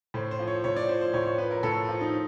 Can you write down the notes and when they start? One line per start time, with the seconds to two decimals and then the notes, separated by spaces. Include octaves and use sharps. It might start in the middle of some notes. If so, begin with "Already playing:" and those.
0.14 A2 C5
0.31 C5
0.39 F3
0.47 C#5
0.64 A2 C#5
0.77 D5
0.89 F3 C5
1.01 C5
1.13 A2 C#5
1.26 C#5
1.38 F3 B4
1.51 A#4
1.63 A2 A4
1.89 F3
2.01 D#4